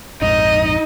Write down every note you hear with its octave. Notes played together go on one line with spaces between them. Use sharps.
A#1 F2 G#2 D#4 D#5